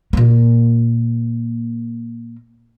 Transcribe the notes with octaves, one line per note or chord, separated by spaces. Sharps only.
A#2 A#3